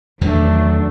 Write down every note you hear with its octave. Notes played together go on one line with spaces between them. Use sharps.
E2 D#3 E3 F#3 A3 D4